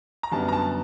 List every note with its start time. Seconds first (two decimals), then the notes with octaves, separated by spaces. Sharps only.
0.23 A#5
0.32 F#2 D3 G3 B3 A5
0.48 A#5
0.52 A5